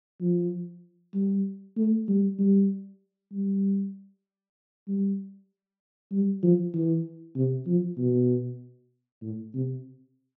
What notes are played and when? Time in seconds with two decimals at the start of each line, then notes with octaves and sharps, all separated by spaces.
0.21 F3
1.14 G3
1.77 A3
2.08 G3
2.39 G3
3.32 G3
4.88 G3
6.12 G3
6.43 F3
6.74 E3
7.36 C3
7.67 F3
7.98 B2
9.22 A2
9.54 C3